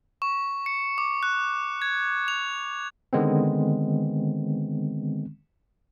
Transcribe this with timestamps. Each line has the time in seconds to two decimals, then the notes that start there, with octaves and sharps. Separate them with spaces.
0.22 C#6
0.66 C#7
0.98 D6
1.23 F#6
1.82 G#6
2.28 F7
3.13 D3 D#3 G#3 B3 C4